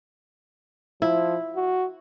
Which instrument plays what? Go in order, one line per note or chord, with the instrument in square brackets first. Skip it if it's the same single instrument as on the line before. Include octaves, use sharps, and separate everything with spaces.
[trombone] F3 [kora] E4
[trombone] F#4